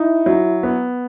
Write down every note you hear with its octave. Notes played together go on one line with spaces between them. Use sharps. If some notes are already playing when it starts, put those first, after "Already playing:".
Already playing: D#4 E4
F#3
B3